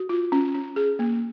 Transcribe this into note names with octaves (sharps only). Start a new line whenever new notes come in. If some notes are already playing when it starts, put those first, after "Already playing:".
Already playing: F#4
F4
C#4
C#4
G#4
A#3